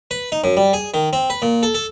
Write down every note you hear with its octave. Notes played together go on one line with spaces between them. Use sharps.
B4
D#4
F#2
G3
G#4
D#3
C4
B4
A#2
A4
A4